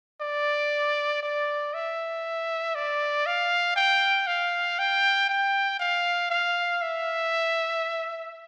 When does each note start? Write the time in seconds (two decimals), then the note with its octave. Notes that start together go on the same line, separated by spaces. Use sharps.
0.21 D5
1.23 D5
1.74 E5
2.75 D5
3.26 F5
3.76 G5
4.27 F5
4.79 G5
5.29 G5
5.79 F5
6.30 F5
6.82 E5